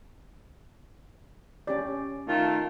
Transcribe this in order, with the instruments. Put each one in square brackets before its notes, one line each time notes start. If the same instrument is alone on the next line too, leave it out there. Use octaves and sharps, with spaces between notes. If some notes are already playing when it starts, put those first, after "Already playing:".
[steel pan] C#4 G4 D5
[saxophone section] D#3 A3 F4